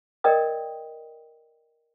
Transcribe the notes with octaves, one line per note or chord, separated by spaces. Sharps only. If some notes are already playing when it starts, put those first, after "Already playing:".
A#4 D5 D#5 G5 D#6